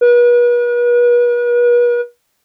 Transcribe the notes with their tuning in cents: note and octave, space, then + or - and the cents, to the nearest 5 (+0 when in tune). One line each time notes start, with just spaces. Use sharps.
B4 -40